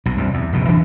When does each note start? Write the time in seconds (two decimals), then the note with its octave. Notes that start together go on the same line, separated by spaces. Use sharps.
0.06 B1 B2
0.18 C2 F#2
0.34 E2
0.53 F1 A#1 B2
0.68 E3 D4